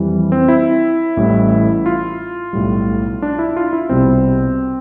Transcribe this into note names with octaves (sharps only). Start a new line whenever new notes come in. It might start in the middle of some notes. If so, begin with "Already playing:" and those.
Already playing: F2 E3 G3
C4
E4
A1 A2 E3 G3
F4
B1 A2 G3
D4
E4
F4
E4
C2 B2 G3 C4